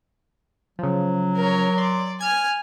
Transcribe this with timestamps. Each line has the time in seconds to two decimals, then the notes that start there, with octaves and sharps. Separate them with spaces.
0.79 C#3 F3 F#3
1.36 A#4 C#5
1.78 D5 C6
2.21 G#5 F6 G#6